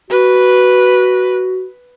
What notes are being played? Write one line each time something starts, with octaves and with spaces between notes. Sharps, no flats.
F#4 B4